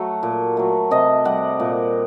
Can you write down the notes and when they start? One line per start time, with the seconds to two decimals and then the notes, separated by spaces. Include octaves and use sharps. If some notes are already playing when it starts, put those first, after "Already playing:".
Already playing: F#3 A3 F#5
0.23 A#2
0.57 F#3 A3
0.91 C3 D#5
1.25 G3 F#5
1.60 A#2